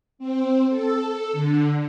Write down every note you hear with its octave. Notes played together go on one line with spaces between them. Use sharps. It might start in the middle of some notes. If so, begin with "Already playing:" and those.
C4
A4
D3